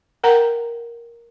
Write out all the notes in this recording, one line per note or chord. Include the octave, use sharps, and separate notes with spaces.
A#4 F#5 G5 A#5